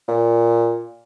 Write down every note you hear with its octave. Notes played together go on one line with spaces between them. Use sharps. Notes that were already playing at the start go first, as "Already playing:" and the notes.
A#2